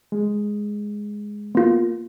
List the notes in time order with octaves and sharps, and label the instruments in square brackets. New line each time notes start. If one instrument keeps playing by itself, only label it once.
[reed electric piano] G#3
[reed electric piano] A#3 [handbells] B3 F4